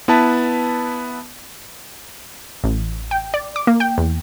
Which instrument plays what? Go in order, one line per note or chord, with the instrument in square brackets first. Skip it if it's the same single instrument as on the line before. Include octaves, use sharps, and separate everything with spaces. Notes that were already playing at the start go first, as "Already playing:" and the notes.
[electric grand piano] B3 E4 B4 A5
[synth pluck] A1
G5
D5
D6
A#3
G5
E2